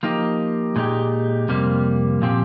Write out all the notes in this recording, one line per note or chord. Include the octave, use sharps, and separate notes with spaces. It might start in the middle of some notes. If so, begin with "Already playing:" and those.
F3 A#3 D#4 G4
A#2 G#3 D#4 G4
F2 C3 G3 A#3
A#2 F3 C4 G4